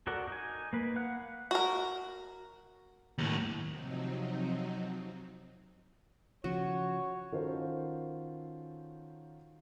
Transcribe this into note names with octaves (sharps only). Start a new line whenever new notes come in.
F#4 A4 A#4 D5 F#5
D#4 G#5
A#3 B4
F5 F#5 F#6
F#4 A#4
D#2 A2
C3 F3 F#3 C4 D#4
C#3 F3 F#4 C#5
D#3 C#4 F4 F#4 A4 C5